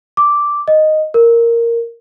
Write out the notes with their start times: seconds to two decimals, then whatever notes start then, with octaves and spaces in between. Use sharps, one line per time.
0.17 D6
0.68 D#5
1.14 A#4